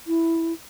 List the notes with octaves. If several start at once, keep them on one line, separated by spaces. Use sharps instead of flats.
E4